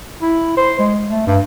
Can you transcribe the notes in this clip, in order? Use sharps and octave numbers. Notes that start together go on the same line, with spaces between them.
E4
C5
G#3
A3
G2